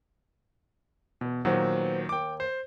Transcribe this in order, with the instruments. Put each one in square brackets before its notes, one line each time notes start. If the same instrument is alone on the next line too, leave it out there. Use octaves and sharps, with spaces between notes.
[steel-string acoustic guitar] E2 [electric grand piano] B2
[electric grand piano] A#2 D#3 F#3 [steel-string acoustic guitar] B3 C5 G#5
[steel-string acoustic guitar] D#2 [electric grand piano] G5 D6
[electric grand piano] C5